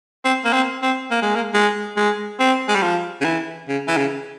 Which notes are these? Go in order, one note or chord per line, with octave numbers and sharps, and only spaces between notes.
C4
A#3
C4
C4
A#3
G#3
A#3
G#3
G#3
C4
G#3
G3
F3
C#3
E3
C#3
E3
C#3